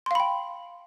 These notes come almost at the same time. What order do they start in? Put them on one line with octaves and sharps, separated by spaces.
C6 F5 B5 G5